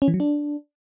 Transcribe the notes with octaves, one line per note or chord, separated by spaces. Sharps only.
C#4
E3
F#3
D4